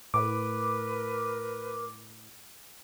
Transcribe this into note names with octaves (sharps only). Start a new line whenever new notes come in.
A2 A#4 B4 D6